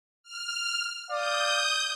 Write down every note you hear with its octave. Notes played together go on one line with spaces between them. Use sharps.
F6
D5 F5 D#6 G6